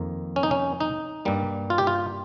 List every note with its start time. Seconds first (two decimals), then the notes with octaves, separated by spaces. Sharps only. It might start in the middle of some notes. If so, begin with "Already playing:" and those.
Already playing: F2 D#3 A#3
0.36 C#4
0.43 D#4
0.51 C#4
0.80 D#4
1.25 G2 G3 A#3
1.70 F4
1.78 G4
1.87 F4